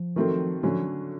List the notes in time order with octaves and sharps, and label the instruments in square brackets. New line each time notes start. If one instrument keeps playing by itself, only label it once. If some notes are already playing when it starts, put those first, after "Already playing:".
Already playing: [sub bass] F3
[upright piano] D#3 F#3 A3 C4
[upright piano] D3 F#3 A3 C#4 [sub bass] F3